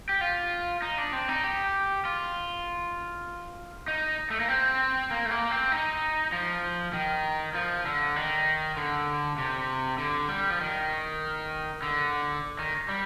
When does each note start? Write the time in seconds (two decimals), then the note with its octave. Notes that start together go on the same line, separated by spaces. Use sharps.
0.09 G4
0.21 F4
0.82 D#4
0.98 D4
1.13 C4
1.28 D#4
1.44 G4
2.05 F4
3.88 D#4
4.30 A3
4.40 A#3
4.48 C4
5.11 A#3
5.26 A3
5.31 A#3
5.51 C4
5.72 D#4
6.32 F3
6.93 D#3
7.55 F3
7.86 D3
8.16 D#3
8.77 D3
9.38 C3
9.98 D3
10.29 G3
10.50 F3
10.61 D#3
11.82 D3
12.59 D#3
12.89 G3